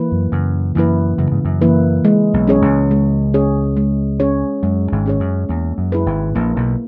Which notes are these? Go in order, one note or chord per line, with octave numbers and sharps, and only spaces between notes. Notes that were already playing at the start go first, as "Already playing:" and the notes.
Already playing: E3 A#3 E4 B4
F#2
F#2 C#3
F#2 E3 A#3 E4 B4
F#2 C#3
G#2
F#2
E3 A#3 E4 B4
G#3
B1 B2
C#4 G#4 C#5
C#2 C#3
G#3
C#4 G#4 C#5
G#3
C#4 G#4 C#5
F#2 G#3
G#1 G#2
C#4 G#4 C#5
F#2
E2 A#3
F#2
E4 G#4 B4
G#1 G#2
A#1 A#2 A#3
B1 B2